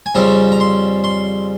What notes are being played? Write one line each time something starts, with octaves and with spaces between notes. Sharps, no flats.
G#5
F2 C#3 G3 C4 A#5
A#5
C6
C6